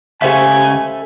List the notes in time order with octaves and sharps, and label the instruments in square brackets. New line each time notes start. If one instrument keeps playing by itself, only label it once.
[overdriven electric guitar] C#2 C#3 [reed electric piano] G4 C5 F5 [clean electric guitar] A4 E5 [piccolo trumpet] G#5